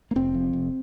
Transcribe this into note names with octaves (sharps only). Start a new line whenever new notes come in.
A#3
F1 C4
F2
F1